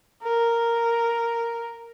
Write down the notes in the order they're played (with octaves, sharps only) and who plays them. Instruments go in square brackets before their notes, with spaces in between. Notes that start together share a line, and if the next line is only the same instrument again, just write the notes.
[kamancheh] A#4